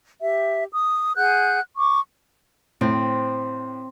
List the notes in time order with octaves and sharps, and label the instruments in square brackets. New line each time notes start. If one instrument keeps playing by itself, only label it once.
[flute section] G4 E5
D#6
G#4 F#5 F#6 G6
C#6 D6
[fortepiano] A2 [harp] C4